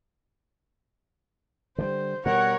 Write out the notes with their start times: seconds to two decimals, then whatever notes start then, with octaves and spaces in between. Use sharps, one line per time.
1.78 D3 D#3 G3 C5
2.26 B2 G3 A#4 C#5 F#5